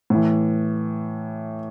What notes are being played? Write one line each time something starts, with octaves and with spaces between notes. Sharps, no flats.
A2 E3